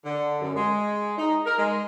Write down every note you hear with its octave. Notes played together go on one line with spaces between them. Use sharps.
D3
F#2
G#3
D#4
A#4
G#3